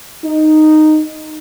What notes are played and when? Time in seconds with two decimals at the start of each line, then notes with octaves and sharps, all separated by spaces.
0.23 D#4